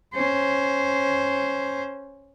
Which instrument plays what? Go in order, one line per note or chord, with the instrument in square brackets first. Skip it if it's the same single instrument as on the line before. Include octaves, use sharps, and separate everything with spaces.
[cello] C#4 C5